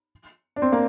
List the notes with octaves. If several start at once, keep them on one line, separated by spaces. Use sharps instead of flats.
D4
C4
A#3